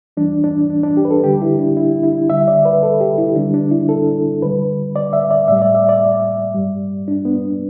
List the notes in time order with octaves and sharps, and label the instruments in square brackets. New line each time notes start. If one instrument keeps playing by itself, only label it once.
[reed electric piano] E2 E3 G3 D4
D4
D4
D4
G4
B4
A4
D2 D3 G3 G4
E4
D4
E4
E4
D2 D3 G3 E5
D5
B4
A4
G4
E4
D2 D3 G3 D4
D4
E4
A4
D2 D3 G3 B4
D5
E5
D5
A2 G3 E5
D5
E5
D5
G2 G3
D4
B3